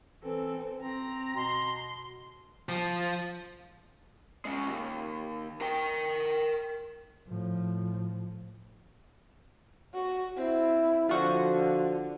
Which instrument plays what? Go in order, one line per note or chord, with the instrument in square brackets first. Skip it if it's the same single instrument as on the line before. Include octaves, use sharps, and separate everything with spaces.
[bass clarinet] E3 [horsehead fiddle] C4 A4
[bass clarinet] C4 [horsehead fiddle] A#5
[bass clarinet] B2 [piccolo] C6
[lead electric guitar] F3
G#3 C#4
D#2
A#4 G5
[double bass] A2 F3
[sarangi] F#4
[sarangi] C4 [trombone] E4
[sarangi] D3 [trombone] F3 [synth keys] F4 F#4 C5